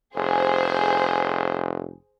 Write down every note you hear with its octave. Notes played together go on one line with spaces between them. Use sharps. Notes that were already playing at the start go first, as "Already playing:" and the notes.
F1 G#4 C5